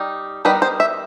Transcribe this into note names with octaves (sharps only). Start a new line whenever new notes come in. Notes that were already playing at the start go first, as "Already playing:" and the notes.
Already playing: G3 D#4
D#3 G3 B3 D#4 B4
C5
E5